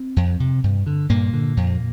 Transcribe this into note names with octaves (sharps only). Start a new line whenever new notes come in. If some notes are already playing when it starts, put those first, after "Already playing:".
Already playing: C4
F2
C3
G2
D3
G2 A#2 A#3
D3
F2